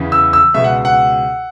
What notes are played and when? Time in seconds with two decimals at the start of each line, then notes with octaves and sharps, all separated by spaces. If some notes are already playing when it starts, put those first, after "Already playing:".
Already playing: E2 C#3 E3
0.12 E6
0.33 E6
0.54 C#2 B2 E5
0.64 F#5
0.85 F#5